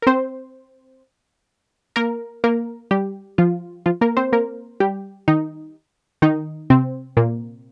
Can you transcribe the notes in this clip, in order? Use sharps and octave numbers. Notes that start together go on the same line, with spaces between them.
A#4
C4 C5
A#3 A#4
A#3 A#4
G3 G4
F3 F4
F3 F4
A#3 A#4
C4 C5
A#3 A#4
G3 G4
D#3 D#4
D#3 D#4
C3 C4
A#2 A#3